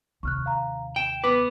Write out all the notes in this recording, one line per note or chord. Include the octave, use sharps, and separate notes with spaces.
D#2 C3 C#6 F6 F#6
F5 A#5
G5 D7 E7
B3 B4 D6